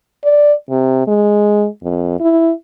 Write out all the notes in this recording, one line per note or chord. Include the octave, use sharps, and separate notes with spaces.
D5
C3
G#3
F2
E4